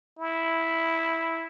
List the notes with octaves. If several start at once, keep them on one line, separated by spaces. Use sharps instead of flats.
E4